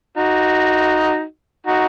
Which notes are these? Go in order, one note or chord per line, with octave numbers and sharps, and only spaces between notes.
D#4 F#4
D#4 F#4